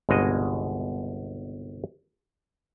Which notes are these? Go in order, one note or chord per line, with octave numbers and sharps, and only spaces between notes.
G1 C2 B2 G#3 C#5 D#5